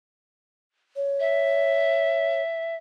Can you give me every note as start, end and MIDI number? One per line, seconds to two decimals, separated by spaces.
0.96 2.42 73
1.20 2.75 76